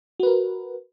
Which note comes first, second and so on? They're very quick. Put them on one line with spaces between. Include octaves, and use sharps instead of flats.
F#4 B4 A#4